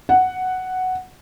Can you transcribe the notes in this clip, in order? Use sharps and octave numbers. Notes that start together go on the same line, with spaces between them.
F#5